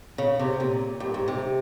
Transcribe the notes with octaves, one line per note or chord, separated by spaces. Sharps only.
C#3
C3
A#2
G2
G#2
C3